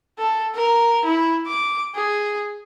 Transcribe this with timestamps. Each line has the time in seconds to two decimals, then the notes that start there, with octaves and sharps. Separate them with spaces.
0.18 A4
0.55 A#4
1.05 E4
1.47 D6
1.95 G#4